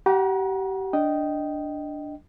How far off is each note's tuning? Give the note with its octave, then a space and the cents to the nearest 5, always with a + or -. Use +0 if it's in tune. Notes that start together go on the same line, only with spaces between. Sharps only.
G4 -30 F#5 +0 A#5 +40
D4 +0 D#5 +0 G5 -10